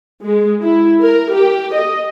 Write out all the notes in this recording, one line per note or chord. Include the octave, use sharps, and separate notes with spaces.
G#3
E4
A#4
G4
D#5